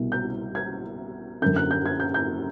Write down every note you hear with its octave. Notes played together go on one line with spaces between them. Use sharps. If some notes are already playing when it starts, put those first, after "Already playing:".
Already playing: C2 B2
G6
G#6
F#2 D3 G6
F#6
G6
G#6
G6
G6